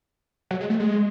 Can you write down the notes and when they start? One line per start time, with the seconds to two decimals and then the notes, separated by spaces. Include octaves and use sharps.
0.51 F#3
0.60 G#3
0.70 A3
0.80 G#3